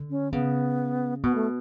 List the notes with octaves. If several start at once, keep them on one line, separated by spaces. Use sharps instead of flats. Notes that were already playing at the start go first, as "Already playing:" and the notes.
Already playing: D3
C#4
C#3 B3
B2 B3
A3